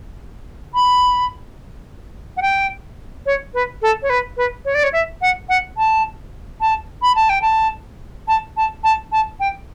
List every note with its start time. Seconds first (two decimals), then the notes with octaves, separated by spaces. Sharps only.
0.74 B5
2.37 F#5
2.42 G5
3.26 C#5
3.54 B4
3.82 A4
4.02 C#5
4.10 B4
4.37 B4
4.65 C#5
4.74 D5
4.83 C#5
4.93 E5
5.21 F#5
5.49 F#5
5.77 A5
6.61 A5
7.02 B5
7.15 A5
7.29 G5
7.42 A5
8.28 A5
8.57 A5
8.84 A5
9.12 A5
9.40 G5